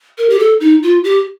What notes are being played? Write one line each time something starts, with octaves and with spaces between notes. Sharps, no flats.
A#4
G4
A4
D#4
F4
G4